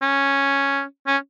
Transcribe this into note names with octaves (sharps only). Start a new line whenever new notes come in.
C#4
C#4